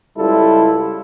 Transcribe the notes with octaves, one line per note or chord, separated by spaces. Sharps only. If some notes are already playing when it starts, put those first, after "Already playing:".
C#2 G3 E4 F4 A4